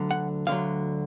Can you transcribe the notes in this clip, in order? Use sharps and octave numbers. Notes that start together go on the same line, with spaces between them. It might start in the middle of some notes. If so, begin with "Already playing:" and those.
Already playing: D2 D3 F#3
F#5
D2 D3 F#3 F5